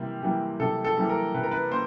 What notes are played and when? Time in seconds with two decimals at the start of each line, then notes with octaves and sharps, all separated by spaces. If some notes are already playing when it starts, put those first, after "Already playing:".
Already playing: C3 E3 G3 A#3
0.22 E3 G3 A#3
0.60 C3 A4
0.85 A4
0.97 E3 G3 A#3
1.09 A#4
1.34 C3 B4
1.43 A#4
1.51 B4
1.71 A#3 C5